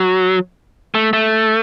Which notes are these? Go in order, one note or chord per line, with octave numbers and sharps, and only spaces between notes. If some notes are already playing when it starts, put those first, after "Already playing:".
Already playing: F#3
A3
A3